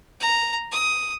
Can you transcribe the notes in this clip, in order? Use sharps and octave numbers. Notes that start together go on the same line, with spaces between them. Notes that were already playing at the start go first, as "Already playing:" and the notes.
A#5
D#6